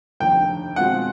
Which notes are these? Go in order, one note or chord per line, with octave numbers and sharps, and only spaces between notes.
F1 D#2 D3 G5
B2 G#3 C4 F4 F#5